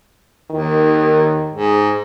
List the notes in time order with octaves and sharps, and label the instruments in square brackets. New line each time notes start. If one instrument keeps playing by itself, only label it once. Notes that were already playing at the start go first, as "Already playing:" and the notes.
[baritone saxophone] D#2 [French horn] D#3
[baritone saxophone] G#2